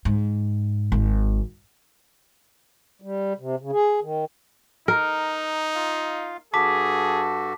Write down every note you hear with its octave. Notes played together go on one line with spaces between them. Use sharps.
G#2
G#1
G3
C3
C#3
G#4
D#3
D#4 A#4
F4 F5
G2 F#4 G#4 A4 A5 D6 B6